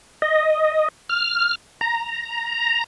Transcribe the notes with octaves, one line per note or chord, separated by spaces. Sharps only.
D#5
F6
A#5